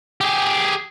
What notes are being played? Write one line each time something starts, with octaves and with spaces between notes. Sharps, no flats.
G4 G#4